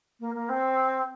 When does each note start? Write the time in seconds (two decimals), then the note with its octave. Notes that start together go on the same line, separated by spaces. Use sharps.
0.20 A#3
0.34 A#3
0.49 C4